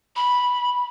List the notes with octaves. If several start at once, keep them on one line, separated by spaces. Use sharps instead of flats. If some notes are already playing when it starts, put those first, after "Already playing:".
B5